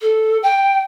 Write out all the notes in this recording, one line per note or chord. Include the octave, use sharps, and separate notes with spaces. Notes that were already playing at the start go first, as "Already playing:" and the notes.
A4
G5